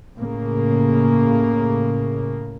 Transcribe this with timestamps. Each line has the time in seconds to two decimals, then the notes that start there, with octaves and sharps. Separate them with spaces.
0.16 A2 C#3 A#3